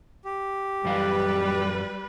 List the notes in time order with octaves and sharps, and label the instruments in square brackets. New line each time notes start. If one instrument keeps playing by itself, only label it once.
[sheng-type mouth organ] G4
[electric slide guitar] F#2 E3 F5 [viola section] G3 B4